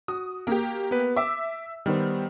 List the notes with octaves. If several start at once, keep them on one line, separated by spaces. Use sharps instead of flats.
F#4 D#6
A#3 G4
B3 B4
E5 D6 E6
D#3 G3 B3 C5